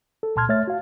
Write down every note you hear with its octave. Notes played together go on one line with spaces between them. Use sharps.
A4
C#2 A#2 A5 C6 F6 G#6
A3 C#5 E5 F6 A6
F#4 F5